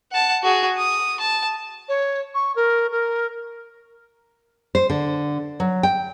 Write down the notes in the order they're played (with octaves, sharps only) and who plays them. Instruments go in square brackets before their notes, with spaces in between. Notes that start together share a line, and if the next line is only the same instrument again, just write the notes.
[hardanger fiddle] F#5 A5
F#4 G#4
D#6
A5
[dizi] C#5
C#6
A#4
A#4
[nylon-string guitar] C5
D3
F#3
G5